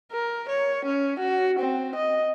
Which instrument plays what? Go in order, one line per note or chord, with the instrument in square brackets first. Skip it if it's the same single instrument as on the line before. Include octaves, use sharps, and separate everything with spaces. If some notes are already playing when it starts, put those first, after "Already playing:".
[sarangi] A#4
C#5
C#4
F#4
C4
D#5